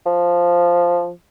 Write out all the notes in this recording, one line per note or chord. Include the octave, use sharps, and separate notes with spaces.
F3